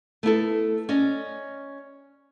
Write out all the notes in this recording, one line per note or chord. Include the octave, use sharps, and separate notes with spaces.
A3 B3 E4 A4
C#4 D5 D#5